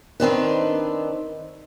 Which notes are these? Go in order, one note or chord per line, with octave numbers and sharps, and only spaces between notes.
D#3 C4 D4 B4